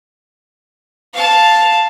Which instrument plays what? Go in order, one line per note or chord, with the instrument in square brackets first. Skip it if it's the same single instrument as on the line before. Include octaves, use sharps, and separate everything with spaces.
[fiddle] F5 A5